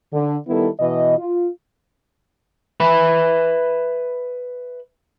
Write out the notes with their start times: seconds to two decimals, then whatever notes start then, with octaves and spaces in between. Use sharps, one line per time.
0.14 D3
0.48 D#3 G3 B3 E4 A4
0.80 B2 E3 D#5
1.18 F4
2.80 B4 E5 B5